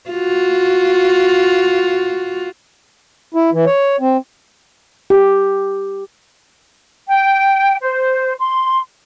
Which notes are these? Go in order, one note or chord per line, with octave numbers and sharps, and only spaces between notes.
F4 F#4
E4
E3
C#5
C4
G4
G5
C5
C6